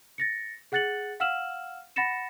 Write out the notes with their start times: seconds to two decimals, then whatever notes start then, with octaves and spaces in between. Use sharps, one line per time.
0.18 A6 A#6 C#7
0.72 G#4 F#5 F#6 A6 C#7 F#7
1.20 F5 F#5 E6 F6 E7 F#7
1.96 F#5 B5 A6 A#6 C#7 E7